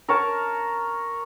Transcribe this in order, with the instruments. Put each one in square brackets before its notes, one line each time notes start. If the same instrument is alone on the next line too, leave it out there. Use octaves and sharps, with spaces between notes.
[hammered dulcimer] A#4 C#5 A5